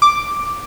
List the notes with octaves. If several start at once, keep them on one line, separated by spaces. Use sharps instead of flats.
D6